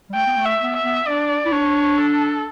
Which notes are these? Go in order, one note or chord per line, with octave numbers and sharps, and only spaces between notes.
G3
A3 G5
B3
A3
E5
B3
E5
B3
D4 D5
E4
D4 C#5
A4